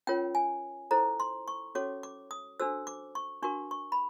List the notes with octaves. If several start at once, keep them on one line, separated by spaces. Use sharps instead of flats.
C#4 F4 A#4 C#5 G5
G#5
E4 A4 C5 A#5
C6
C#6
C#4 F#4 A4 C#5 D6
D6
D#6
D4 F#4 A4 C5 E6
D6
C#6
D4 F#4 A#4 C#6
C#6
B5